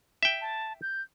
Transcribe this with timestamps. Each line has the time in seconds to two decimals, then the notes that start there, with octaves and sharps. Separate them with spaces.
0.23 E5 G5
0.41 A5
0.82 G6